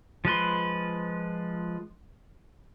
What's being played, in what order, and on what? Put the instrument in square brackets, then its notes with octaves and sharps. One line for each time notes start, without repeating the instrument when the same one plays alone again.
[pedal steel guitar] F3 G#3 B4 C6